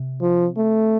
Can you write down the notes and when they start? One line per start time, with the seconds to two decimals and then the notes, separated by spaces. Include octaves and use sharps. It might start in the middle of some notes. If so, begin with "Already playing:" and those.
Already playing: C3
0.21 F3
0.57 A3